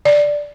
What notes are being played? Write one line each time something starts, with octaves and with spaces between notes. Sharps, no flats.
D5